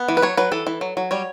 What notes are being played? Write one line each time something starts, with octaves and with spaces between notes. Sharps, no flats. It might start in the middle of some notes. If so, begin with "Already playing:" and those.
Already playing: B3
E3
B4
F#3 C#5
F#3 B4
E3 A4
E3
F#3
F#3
G3 C#5